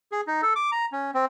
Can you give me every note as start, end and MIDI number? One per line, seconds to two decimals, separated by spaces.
0.12 0.21 68
0.27 0.41 63
0.42 0.53 69
0.56 0.70 86
0.72 0.86 82
0.92 1.11 61
1.14 1.25 60